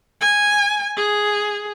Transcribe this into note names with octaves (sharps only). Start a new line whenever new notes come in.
G#5
G#4